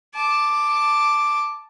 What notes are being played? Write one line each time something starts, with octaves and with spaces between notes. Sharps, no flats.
A5 D6